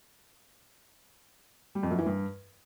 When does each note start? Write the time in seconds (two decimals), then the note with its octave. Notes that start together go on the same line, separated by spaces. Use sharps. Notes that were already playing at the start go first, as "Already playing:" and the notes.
1.75 G3
1.83 F2
1.91 F#2
1.99 E3
2.06 G2